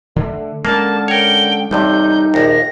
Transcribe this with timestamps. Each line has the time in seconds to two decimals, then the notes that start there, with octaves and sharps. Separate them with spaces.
0.16 D3 A3
0.65 D3 G#3 A#3 C#4 A5
1.08 A#4 C#5 G5
1.71 A1 G2 C3 G3 D#4 G6
2.34 A#1 D#2 A#6